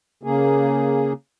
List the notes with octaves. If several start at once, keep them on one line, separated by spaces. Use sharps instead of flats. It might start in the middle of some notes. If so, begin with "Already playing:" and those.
C#3 A#3 G#4